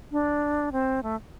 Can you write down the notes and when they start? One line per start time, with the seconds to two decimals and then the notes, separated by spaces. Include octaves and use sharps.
0.12 D4
0.72 C4
1.03 A3